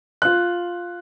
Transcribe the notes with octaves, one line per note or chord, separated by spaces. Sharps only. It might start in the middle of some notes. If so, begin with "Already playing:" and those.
F4 F#6